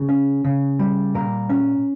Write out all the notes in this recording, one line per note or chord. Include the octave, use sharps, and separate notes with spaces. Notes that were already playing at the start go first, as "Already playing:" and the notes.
Already playing: C#3
C#4
C#3
G3
A#2 A#4
C#4